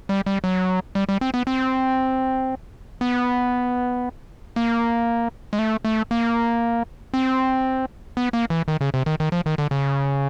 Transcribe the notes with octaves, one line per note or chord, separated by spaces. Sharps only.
G3
G3
F#3
G3
G3
C4
B3
C4
B3
A#3
G#3
A3
A3
A#3
C4
B3
A#3
E3
D#3
C#3
C3
D#3
D#3
F3
D#3
D3
C#3